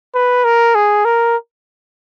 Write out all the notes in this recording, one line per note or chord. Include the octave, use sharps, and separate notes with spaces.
B4
A#4
G#4
A#4